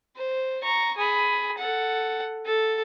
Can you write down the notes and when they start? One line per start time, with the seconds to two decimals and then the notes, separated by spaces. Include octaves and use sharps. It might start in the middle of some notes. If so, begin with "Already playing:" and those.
0.16 C5
0.63 A#5 C#6
0.97 G#4 B5
1.58 A4 F#5
2.45 A4